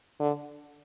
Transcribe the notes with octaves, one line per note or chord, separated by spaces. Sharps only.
D3